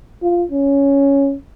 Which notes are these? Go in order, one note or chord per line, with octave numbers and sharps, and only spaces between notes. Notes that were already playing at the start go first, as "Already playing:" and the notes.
F4
C#4